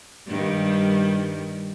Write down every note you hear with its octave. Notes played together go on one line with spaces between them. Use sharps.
G2 D#3 G3